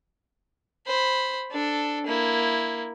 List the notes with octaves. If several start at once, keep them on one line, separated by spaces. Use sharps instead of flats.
C5 B5
D4 A4
A#3 E4